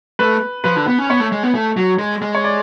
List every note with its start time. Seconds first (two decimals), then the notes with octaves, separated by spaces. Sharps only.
0.19 A3 B4
0.64 F3 B4
0.76 D3
0.87 B3
0.99 C#4
1.10 B3 C#5
1.20 A3
1.32 G#3
1.43 B3
1.55 A3
1.77 F#3
1.99 G#3
2.22 G#3
2.35 C#5
2.44 D5